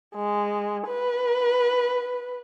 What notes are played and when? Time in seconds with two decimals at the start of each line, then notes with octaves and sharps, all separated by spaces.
0.15 G#3
0.88 B4